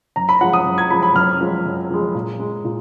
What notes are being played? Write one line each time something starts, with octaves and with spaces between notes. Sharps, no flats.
F#2 A#5
B5
F3 G#3 F#5
D#6
F#2
G#6
F3 G#3 B5
B5
F#2 F6
F3 G#3
F#2
F3 G#3
A#2
G#3
A#2